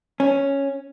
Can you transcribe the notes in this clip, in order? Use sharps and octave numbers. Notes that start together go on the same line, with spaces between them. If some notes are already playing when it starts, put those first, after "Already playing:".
C#4